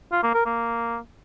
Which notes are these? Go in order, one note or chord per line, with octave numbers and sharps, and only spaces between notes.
F4
A#3
A#4
A#3